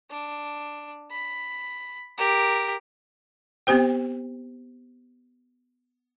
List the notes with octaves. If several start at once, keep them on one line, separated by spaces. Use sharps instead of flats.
D4
B5
G4 A#4
B3 C4 G4 C5 G5